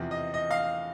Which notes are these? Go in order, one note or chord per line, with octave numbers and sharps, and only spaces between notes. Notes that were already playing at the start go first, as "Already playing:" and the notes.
Already playing: E2 C3 F3
D#5
D#5
F5